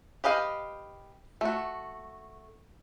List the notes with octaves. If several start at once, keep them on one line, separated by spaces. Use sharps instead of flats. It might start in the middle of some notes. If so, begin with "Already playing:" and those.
G4 B4 D#5 F5 G5
A3 F#4